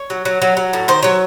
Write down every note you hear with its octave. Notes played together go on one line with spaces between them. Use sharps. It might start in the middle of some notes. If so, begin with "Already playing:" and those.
Already playing: C#5
F#3
F#3
F#3
F#3
A2
D#3 C5
F#3 C#5